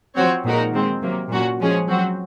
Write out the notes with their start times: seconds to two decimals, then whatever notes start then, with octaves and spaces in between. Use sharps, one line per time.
0.16 F3 C4 F#4 C#5
0.44 A#2 G#3 D#4 F#4 A#4
0.73 D#3 G#3 C4
1.02 C3 F#3 A#3
1.31 A#2 F#3 C#4 F#4
1.60 F3 G#3 C#4 G#4
1.89 F#3 C4 F#4